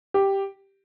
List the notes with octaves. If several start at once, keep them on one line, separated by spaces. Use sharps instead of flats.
G4